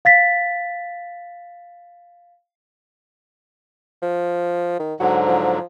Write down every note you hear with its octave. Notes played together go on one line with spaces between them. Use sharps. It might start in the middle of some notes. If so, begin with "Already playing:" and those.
F5 A6 B6
F3
D#3
G#2 D3 F#3 F#4
F3